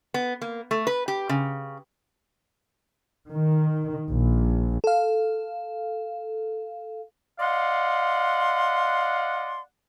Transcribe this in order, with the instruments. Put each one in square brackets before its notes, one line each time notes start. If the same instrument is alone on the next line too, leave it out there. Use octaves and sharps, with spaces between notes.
[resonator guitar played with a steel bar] B3
A#3
A3
B4
G4
C#3
[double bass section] D#3
A#1
[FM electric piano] A4 F5
[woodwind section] D5 D#5 F5 F#5 C6